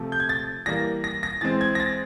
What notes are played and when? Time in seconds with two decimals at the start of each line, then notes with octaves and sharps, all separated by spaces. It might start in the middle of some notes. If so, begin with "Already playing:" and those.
Already playing: C3 F3 A3
0.12 G6
0.20 G#6
0.29 A6
0.66 E3 G3 A#3 A#6
1.04 A#6
1.23 A#6
1.41 E3 G#3 C4 A6
1.61 G#6
1.75 A#6
1.80 A6